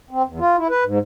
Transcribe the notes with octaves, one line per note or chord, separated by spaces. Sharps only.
C4
E2
F4
E4
B4
G#2